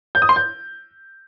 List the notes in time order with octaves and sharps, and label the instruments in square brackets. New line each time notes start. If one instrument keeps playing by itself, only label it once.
[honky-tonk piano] G6
D#6
C6
G6